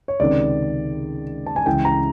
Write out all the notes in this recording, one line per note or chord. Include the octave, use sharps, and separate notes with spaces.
C#5
C#2 C3 D#3 D5
A5
G#5
C#2 C#3 E3 G5
A#5